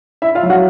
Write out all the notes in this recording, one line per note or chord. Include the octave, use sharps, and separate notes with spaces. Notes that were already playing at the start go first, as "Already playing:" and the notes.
E4 E5
F4 F5
F#3
F#4 F#5